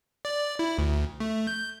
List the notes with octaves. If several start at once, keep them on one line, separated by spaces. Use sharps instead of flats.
D5
E4
D2
A3
G6